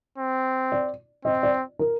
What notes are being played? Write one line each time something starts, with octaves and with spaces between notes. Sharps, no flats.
C4
D5
C4 D#5
D5
A#4